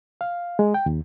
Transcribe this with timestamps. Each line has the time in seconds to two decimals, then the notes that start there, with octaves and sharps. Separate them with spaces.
0.21 F5
0.59 G#3
0.74 G5
0.86 D#2